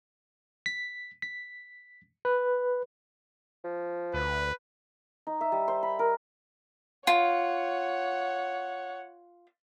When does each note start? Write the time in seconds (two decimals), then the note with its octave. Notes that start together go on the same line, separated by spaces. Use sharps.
0.66 B6
1.22 B6
2.25 B4
3.64 F3
4.14 D2 B4
5.27 D#4
5.41 E5
5.52 G3
5.68 C5
5.83 B5
5.99 A#4
7.07 F4 C#5 F#5